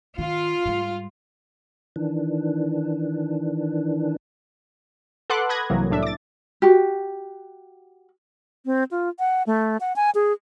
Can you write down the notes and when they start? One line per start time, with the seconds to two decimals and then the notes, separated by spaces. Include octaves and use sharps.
0.18 D#3 F4
0.65 G#2 G3
1.96 D#3 E3 D4
5.30 A4 B4 F#5 C6 D6 F#6
5.49 B5 D#6 F#6 G#6 A#6
5.70 C2 C3 E3 F#3 A#3
5.90 C2 A2 D4 E5
6.03 D6 A6
6.62 F#4 G4
8.65 C4
8.91 F4
9.19 F#5
9.47 A3
9.81 F#5
9.96 G#5
10.15 G#4